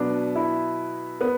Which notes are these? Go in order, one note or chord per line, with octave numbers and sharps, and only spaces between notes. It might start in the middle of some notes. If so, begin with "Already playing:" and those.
Already playing: B2 F#3 B3 D4
E4
B3